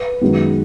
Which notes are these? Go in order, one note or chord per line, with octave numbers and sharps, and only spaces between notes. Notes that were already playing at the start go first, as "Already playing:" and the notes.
Already playing: B4
F#2 D#3 G#3 B3